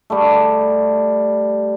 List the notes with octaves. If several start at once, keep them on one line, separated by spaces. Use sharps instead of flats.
G3 A3